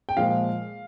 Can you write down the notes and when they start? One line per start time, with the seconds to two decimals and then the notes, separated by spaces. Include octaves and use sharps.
0.09 G5
0.17 A#2 F3 G#3 F5